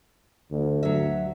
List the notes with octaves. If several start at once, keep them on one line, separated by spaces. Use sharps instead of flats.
D2
F#3 E5